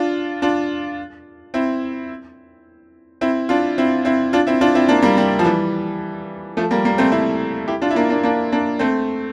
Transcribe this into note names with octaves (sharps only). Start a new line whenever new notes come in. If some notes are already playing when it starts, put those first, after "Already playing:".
Already playing: D4 F4
D4 F4
C4 E4
C4 E4
D4 F4
C4 E4
C4 E4
D4 F4
C4 E4
D4 F4
C4 E4
A#3 D4
G3 A#3
G3 A#3
F3
E3 G3
F3 A3
G3 A#3
G3 A#3
A3 C4
C4 E4
E4 G4
D4 F4
E4
A#3 D4
A#3 D4
A#3 D4
A#3 D4
A3 C4